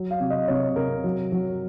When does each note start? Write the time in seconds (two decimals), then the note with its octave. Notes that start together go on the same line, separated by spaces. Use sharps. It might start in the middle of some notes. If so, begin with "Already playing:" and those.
Already playing: F#3
0.11 F5
0.20 C3
0.30 D#5
0.48 C3 C#5
0.76 C3 A#4
1.04 F#3
1.32 F#3